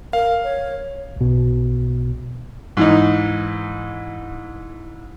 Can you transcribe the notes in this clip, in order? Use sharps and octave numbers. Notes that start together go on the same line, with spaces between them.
A#4 F5
C#5
B1 B2
G#2 E3 D#4